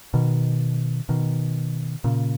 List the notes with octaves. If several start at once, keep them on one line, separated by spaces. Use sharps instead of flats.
B2 D#3
B2 D#3
A#2 C#3